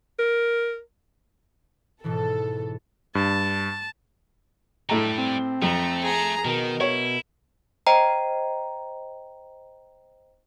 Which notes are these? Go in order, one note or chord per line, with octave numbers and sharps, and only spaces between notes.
A#4
G#2 B2 E3 A4
G2 A5
A2 G3 A3 B4 A#5
C4
F2 A3 A#5
G#4 A#5
B2 D#3 A#4
E4 C#5
C5 D#5 G5 A#5